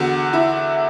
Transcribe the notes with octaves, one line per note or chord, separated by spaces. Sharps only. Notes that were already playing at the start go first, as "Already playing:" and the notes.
Already playing: E2 D3 F#4
E4